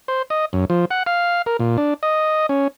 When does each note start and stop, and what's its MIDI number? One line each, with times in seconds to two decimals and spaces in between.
0.08 0.22 72
0.30 0.45 75
0.53 0.65 42
0.70 0.85 53
0.91 1.03 78
1.06 1.42 77
1.46 1.57 70
1.60 1.77 46
1.77 1.94 62
2.03 2.46 75
2.49 2.68 61